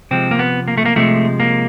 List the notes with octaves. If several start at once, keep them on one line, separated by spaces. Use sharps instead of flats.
C3 F3 G#3 C4
A#3
B3
A#3
A3
A#3
C3 F3 G#3 A3
A#3